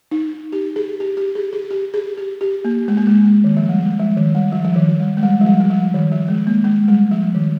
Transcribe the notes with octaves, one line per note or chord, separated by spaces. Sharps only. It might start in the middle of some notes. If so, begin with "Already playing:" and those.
D#4
G4
G#4
G4
G4
G#4
G#4
G4
G#4
G4
G4
A#3
G#3
A#3
G#3
D#3
F3
G3
G#3
F3
D#3
G3
F3
F3
D#3
G3
G#3
G3
F3
G3
G3
F3
D#3
F3
G#3
A#3
G#3
G3
F3
D#3